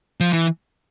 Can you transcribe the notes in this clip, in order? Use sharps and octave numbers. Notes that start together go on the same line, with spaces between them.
F3
E3